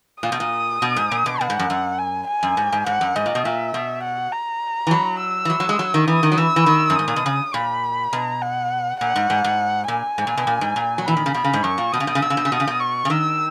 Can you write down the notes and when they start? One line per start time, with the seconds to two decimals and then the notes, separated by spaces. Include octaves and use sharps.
0.23 A#2 D#6
0.32 B2
0.40 A#2
0.82 B2
0.96 G#2
1.11 A#2
1.26 B2
1.41 B2 F#5
1.50 G#2
1.59 F#2
1.70 F#2
1.99 G#5
2.27 G#5
2.43 F#2
2.57 G#2
2.72 G#2
2.86 G#2 F#5
3.01 F#2
3.16 G#2 D#5
3.26 A#2
3.35 B2
3.45 A#2 E5
3.74 B2
4.03 F#5
4.33 A#5
4.87 E3
4.91 F#3
5.21 E6
5.45 E3
5.50 F#3
5.60 F#3
5.69 G#3
5.79 F#3
5.94 D#3
6.07 E3 D#6
6.23 D#3
6.32 F#3
6.38 E3 E6
6.56 E3
6.66 D#3
6.90 F#2
6.95 G#2 D#6
7.08 A#2
7.16 B2
7.26 C#3
7.54 A#2 B5
8.13 B2 A#5
8.42 F#5
9.00 A#2 F#5
9.16 G#2
9.30 G#2
9.44 G#2
9.88 A#2 G#5
10.18 G#2
10.27 A#2
10.37 B2
10.47 A#2
10.61 G#2
10.76 A#2
10.98 F#3
11.06 E3 B5
11.17 D#3
11.26 C#3
11.34 B2 B5
11.44 C#3
11.53 G#2
11.63 F#2 C#6
11.78 A#2
11.92 B2 D#6
12.00 C#3
12.07 B2
12.15 C#3
12.22 B2 E6
12.30 C#3
12.37 B2
12.45 C#3
12.52 B2 D#6
12.60 C#3
12.67 B2
12.80 C#6
13.05 C#3
13.10 D#3 E6